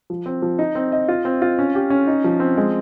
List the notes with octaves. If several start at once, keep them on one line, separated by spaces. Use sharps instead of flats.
F3
C4
F3
D#4
C4
D#5
F4
C4
F4
C#4
G4
C#4
D#4
F3
C4
G#3